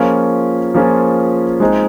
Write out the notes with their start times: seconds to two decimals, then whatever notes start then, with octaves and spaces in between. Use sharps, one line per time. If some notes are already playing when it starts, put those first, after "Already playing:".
Already playing: F3 A#3 C#4 F4 G#4
0.74 F3 A#3 C#4 F4 G#4
1.60 G#3 C4 D#4